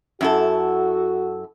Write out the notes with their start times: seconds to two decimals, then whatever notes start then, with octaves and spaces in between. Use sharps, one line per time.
0.21 F#2 E4 F#4 A4